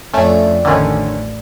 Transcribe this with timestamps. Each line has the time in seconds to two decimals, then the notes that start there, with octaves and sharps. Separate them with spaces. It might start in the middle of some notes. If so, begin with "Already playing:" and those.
0.14 F2 A3 C#4 D4
0.65 A1 D3 D#3 C#4